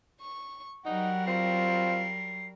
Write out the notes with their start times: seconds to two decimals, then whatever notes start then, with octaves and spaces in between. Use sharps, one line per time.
0.21 C#6
0.85 F#3 G3 D#4 A#4 F#5
1.27 C4 F4 C7